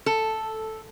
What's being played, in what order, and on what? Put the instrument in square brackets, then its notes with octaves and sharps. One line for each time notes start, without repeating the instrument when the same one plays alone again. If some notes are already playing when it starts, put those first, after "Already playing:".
[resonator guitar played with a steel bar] A4